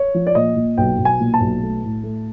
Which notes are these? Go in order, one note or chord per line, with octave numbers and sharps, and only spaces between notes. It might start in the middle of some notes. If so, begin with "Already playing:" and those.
Already playing: C#5
F3
D5
A#2 D#5
A#2
B1 G5
B1
G#5
A#2
A5
B1
A3
A2
A3